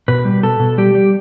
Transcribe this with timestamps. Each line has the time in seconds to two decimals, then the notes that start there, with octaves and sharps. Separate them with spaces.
0.08 B2 B4
0.25 G3
0.43 B2 A4
0.60 B2
0.78 G3 G4
0.95 G3